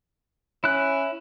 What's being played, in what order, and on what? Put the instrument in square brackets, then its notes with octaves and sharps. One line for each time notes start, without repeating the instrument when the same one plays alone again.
[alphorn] C#4 [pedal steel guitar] E4 F#6